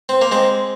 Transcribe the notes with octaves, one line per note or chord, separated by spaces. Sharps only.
C4
A#3
G#3 C4